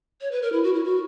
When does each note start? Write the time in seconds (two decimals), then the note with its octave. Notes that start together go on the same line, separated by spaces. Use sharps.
0.21 C#5
0.31 B4
0.42 A#4
0.53 E4
0.63 F#4
0.74 E4
0.85 F#4